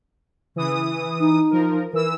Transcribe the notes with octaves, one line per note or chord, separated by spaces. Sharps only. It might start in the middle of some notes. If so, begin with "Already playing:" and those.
C#3 E3 D#6
D#4
F3 A#4
E3 A#4 E6